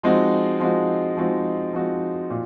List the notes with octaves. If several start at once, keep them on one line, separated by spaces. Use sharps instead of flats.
F3 G#3 C4 D#4 F#4
F3 G#3 C4 D#4 F#4
F3 G#3 C4 D#4 F#4
F3 G#3 C4 D#4 F#4
A#2